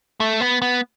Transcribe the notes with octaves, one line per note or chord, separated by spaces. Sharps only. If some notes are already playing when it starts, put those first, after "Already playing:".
A3
B3
B3